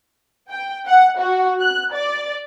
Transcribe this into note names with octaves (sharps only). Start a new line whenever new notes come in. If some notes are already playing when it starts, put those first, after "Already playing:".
G5
F#5
F#4
F#6
D5